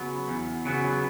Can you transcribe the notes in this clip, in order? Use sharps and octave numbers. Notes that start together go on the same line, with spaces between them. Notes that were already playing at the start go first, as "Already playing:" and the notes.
Already playing: C#3 F#3 B3
E2
C#3 F#3 B3